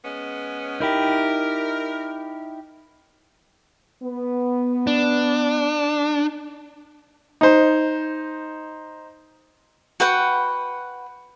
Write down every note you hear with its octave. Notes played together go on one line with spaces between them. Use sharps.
G#3 B3 C#4
D#4 E4 G4 A#4
B3
D4
D#4 C5
F#4 B4 F#5 G5